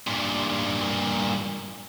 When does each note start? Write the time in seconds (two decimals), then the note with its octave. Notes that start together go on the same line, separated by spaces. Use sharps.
0.07 G2 A#2